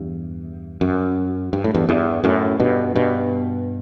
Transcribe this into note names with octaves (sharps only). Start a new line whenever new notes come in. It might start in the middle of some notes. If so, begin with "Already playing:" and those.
Already playing: E2 G2
F#2
G2
A2
E2 G2
E2 G2
F#2 A2
G2 B2
G2 B2